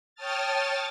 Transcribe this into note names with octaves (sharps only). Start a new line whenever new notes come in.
C#5 G5 A5 D#6 F6 A6